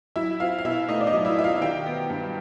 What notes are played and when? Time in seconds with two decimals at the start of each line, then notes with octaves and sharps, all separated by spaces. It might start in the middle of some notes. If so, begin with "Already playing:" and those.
0.16 F#3 E4 E5
0.40 C4 F4 F5
0.58 F5
0.65 B2 E4 E5
0.89 A3 D#4 D#5
1.01 D5
1.07 D#4 D#5
1.13 F#3
1.25 E4 E5
1.38 C4 E5
1.44 F4 F5
1.61 D#3 G4 G5
1.86 B3
2.10 G2